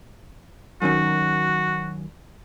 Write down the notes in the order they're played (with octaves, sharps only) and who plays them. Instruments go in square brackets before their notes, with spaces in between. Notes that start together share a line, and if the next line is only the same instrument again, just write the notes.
[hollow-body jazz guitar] F#2 D#3 C#4 [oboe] F#4